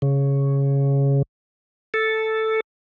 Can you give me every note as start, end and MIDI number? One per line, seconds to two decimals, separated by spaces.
0.02 1.22 49
1.94 2.60 69